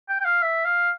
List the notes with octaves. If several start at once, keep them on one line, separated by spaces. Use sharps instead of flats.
G5
G5
F5
E5
F5